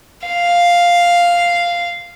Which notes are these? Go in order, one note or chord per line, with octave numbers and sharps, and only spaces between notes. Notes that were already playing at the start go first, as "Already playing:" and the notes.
F5